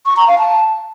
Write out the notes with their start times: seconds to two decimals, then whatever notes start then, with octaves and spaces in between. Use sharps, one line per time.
0.06 C#6
0.17 A#5
0.28 F5
0.38 A5